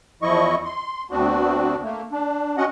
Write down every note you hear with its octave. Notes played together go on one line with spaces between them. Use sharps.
E2 F3 E4 D#5 C#6
C6
D2 B3 C4 D4 F#4
A3 A#3
D4
C#4 F#4 D#5 F#5